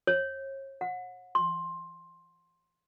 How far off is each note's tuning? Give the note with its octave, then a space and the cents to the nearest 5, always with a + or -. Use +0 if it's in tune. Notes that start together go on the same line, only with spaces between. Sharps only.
C#5 -40
F#5 -25
C6 +15